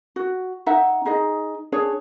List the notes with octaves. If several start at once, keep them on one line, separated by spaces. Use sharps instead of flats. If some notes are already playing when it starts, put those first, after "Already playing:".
F#4
D#4 E5 F#5
D#4 G#4 D#5
D4 G#4 C#5